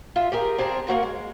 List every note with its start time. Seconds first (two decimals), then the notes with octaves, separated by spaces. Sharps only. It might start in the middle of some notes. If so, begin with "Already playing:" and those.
0.16 F4 E5
0.32 G4 G#4 A#4
0.58 C4 D4 G#4 A#4
0.87 A#3 C4 F#4 A#4
1.03 G#3